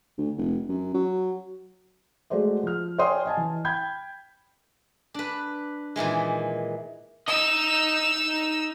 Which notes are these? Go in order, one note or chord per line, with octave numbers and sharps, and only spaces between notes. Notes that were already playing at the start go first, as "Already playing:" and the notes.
D2
F1
F#2
F#3
G#3 A3 F#4 G#4 C5 D5
F3 F6
C#5 D5 G5 G#5 C6 D#6
D#5 G#5 A5
E3
G5 B5 G6 G#6
D4 B4
A#2 D#3 E3 G#3
D#4 D#5 E6